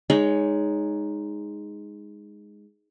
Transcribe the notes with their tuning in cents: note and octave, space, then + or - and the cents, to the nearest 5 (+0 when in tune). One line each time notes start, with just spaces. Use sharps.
G#3 -5 D#4 +0 C#5 +15